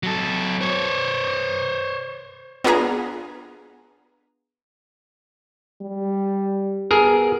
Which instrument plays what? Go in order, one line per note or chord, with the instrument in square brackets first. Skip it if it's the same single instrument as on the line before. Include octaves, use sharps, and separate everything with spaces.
[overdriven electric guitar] F#3 A4
C5 C#5
[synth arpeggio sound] B3 D4 F4 G#4 A#5
[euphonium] G3
[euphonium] B3 [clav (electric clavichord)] G#4 A#4